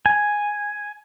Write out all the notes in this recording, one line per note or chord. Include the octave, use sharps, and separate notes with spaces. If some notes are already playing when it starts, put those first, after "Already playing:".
G#5